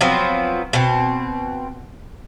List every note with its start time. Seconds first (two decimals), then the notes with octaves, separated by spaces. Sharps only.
0.01 F3 F#3 B3 C4
0.73 B2 C4